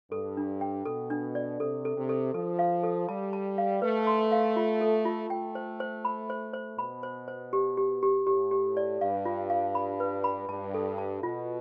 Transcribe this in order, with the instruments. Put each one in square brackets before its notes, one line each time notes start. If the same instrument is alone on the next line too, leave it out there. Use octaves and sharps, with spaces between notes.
[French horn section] G2 [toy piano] A4
[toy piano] D4
G5
[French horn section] B2 [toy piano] A4
[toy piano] D4
D5
[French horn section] C3 [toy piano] A4
[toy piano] A4
[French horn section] C3
[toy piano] A4
[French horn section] F3 [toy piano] A4
[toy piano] F5
A4
[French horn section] G3 [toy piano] A5
[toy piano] A5
F5
[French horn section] A3 [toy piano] B4
[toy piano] C6
F5
F4
A4
F4
[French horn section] A3 [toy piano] G5
[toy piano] C5
C5
B5
C5
C5
[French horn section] B2 [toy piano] B5
[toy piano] C5
C5
G4
G4
G4
[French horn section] A2 [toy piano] G4
[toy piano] G4
D5
[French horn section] G2 [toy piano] F5
[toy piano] F4
F5
B5
B4
B5
[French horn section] G2 [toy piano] A5
[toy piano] A4
A5
[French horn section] B2 [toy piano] F4